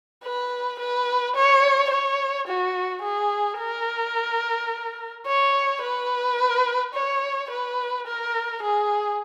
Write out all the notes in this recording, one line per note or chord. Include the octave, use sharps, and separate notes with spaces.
B4
B4
C#5
C#5
F#4
G#4
A#4
C#5
B4
C#5
B4
A#4
G#4